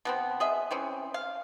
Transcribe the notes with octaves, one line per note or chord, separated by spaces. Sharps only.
B2 B3 C4
G#4 D#5 E5
E3 C4 C#4
F5